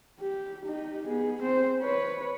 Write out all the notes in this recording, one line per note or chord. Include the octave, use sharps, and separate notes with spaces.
G4
D#4 G4
B3 G#4
C4 C5
B4 C#5